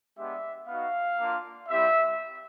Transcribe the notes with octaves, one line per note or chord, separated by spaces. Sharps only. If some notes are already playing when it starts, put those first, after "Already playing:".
G#3 B3 D4 G4 E5
B3 D#4 F#4 F5
A#3 D4 F4
G3 C4 E4 G4 E5